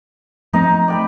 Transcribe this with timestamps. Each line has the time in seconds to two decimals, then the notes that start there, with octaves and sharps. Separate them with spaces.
0.53 F3 A3 C4 D#4 D#5 A#5
0.88 D5 G5 B5